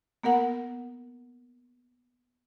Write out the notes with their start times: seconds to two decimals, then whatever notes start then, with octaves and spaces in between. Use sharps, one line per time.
0.23 A#3 B3 A#4 F#5